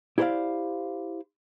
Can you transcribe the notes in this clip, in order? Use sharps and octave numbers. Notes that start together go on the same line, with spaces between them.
E4 G4 A4 C5 D5 F5